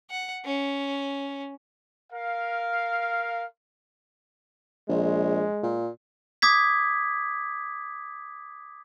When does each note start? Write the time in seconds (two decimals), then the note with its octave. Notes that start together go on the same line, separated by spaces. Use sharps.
0.10 F#5
0.45 C#4
2.13 A#4 F5
4.88 A#1 G#3
5.63 A#2
6.42 D6 D#6 G#6 B6